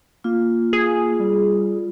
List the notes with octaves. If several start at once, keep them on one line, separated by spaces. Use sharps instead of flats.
A#3 F4
G#4
G3